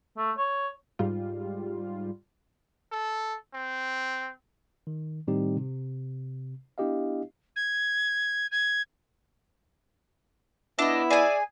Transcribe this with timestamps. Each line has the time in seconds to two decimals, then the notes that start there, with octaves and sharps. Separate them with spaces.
0.17 A3
0.38 C#5
0.99 G#2 G3 F4
2.92 A4
3.54 C4
4.87 D#3
5.28 A2 D#3 G3 C4 D#4 G4
5.57 C3
6.78 B3 D4 E4 G4 D#5 F5
7.56 G#6
8.51 G#6
10.79 B3 D4 E4 D#5 E5
11.11 G#4 D5 G#5